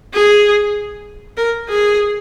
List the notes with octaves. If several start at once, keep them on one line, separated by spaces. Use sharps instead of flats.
G#4
A#4
G#4